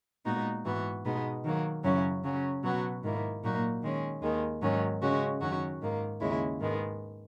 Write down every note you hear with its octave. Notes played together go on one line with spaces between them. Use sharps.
A#2 G#3 B3 D#4 F#4
G#2 E3 B3 F#4
B2 G#3 B3 D#4
D#3 F#3 A#3
F#2 C#3 F#3 C#4 E4
C#3 F#3 C#4
B2 F#3 B3 F#4
G#2 D#3 A#3 E4
A#2 F#3 A#3 D#4 F#4
D#3 G#3 C#4
D#2 D#3 G#3
G#2 D#3 F#3 C#4
C#3 G#3 C#4 F#4
F#2 D#3 F#3 C#4 F#4
G#2 D#3 A#3
D#2 C#3 G#3 C#4 E4
G#2 D#3 G#3 B3